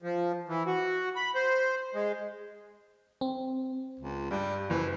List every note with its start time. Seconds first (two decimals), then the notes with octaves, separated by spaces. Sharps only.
0.02 F3
0.49 E3
0.67 F#4
1.16 B5
1.35 C5
1.95 G#3
3.21 C4
3.99 C#2
4.31 G2 G3
4.70 F#1 E3